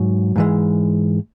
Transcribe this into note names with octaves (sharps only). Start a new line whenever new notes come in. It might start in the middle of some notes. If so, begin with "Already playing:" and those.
Already playing: G#2 F#3
G#2 E3 G#3